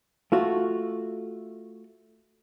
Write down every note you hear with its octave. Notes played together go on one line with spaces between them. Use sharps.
A3 F4 F#4